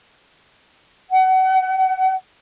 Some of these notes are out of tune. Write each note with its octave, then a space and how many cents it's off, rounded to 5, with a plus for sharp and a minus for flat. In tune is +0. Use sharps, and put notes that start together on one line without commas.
F#5 +30